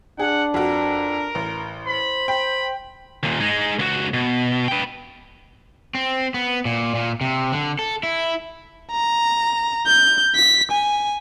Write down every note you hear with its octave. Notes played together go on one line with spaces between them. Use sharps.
D4 G#4 F#5
F2 F#4 A#4
A1
C5 B5
G5 B5
D#2 A#2
G#3 D#4
C#2 F#4
B2
B4 G5
C4
B3
A#2
A#2
C3
D3
A4
E4
A#5
G6
B6
G#5